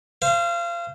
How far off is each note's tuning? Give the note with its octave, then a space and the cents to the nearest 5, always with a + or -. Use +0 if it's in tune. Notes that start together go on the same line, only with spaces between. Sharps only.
C5 +0 F5 -30